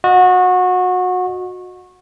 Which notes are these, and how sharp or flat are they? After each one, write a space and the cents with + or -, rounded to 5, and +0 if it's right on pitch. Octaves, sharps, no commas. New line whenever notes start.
F#4 -25 D#5 -5